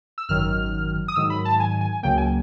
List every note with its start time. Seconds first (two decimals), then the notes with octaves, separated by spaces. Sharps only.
0.18 E6
0.29 G#1 F#2 D#3 F#3 F6
1.08 D#6
1.16 G#2 D#3 F#3 E6
1.30 B5
1.45 A5
1.60 G#5
1.81 G#5
2.03 C#2 C#3 F#3 A#3 G5
2.18 G#5